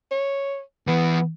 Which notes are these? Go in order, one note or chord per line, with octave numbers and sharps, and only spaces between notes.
C#5
E2 E3 B3